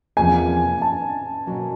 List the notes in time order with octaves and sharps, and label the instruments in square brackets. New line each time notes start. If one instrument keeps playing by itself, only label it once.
[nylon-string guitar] E2 C3 F3 A#3 [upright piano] G#5
[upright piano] A5
[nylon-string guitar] B2 F#3 A#3